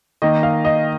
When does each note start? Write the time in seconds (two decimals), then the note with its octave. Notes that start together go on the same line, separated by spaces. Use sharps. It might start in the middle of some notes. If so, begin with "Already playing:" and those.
0.22 D#3 A#3 D#5
0.43 F5
0.65 D#5